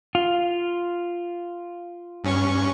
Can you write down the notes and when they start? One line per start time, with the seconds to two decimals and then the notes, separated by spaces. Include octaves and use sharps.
0.15 F4
2.24 G2 C#4 C#6